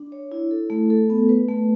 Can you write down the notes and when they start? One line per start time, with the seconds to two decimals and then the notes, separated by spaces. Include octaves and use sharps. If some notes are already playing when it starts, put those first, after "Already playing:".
Already playing: D4
0.12 C#5
0.32 E4
0.51 A4
0.70 A3
0.90 A4
1.10 B3
1.29 B4
1.48 A3